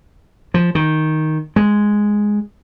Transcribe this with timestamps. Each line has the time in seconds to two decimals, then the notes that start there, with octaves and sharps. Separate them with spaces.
0.54 F3
0.75 D#3
1.56 G#3